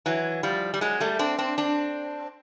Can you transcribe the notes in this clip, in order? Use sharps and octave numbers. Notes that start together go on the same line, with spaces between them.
E3 F#3
F3 G3
G3
F#3 G#3
G3 A3
C4 D4
C4 D4
C4 D4